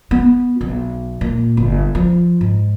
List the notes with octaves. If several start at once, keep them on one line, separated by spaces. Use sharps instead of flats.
B3
B1
A#2
G1
F3
G#2